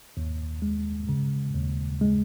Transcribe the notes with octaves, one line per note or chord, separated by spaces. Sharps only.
D#2
G#3
C#3
D#2
G#3